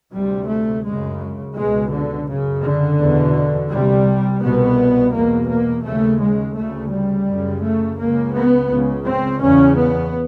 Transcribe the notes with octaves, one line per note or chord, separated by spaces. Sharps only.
D2 C3 G3
A3
F#2 C#3 G#3
C#2 B2 G#3
D3
F#2 C#3
D3
E2 B2
C2 C3 G3
C2 B2 B3
E2 B2 A#3
A#3
D#2 C#3 A3
G#3
D2 C#3 A3
G3
F#2 C#3
A3
C#2 C#3 A#3
B3
C#2 C#3
C4
E2 C#3 C#4
B3